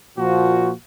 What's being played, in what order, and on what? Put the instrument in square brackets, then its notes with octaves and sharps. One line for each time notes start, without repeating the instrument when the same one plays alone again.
[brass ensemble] A#2 F3 F#4